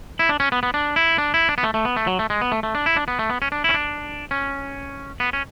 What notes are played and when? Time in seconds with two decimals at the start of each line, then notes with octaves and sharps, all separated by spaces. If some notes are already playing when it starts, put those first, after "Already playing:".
0.19 E4
0.29 D4
0.40 C#4
0.52 B3
0.63 B3
0.74 D4
0.96 E4
1.18 D4
1.34 E4
1.49 D4
1.58 B3
1.64 A3
1.74 A3
1.85 B3
1.96 A3
2.07 F#3
2.19 A3
2.30 G#3
2.41 B3
2.52 A3
2.63 A3
2.75 D4
2.86 E4
2.96 D4
3.08 B3
3.19 A3
3.30 B3
3.42 C#4
3.52 D4
3.64 C#4 E4
3.74 D4
4.31 C#4
5.20 B3
5.33 C#4